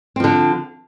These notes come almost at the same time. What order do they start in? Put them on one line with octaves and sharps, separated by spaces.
C4 F3 D3